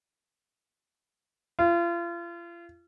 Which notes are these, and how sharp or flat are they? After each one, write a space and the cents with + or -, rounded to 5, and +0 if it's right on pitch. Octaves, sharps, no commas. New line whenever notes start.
F4 -35